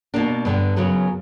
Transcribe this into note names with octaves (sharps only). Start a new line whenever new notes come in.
B2 A#3 D4
G2 D3 G3 B3
F#2 C#3 F#3 B3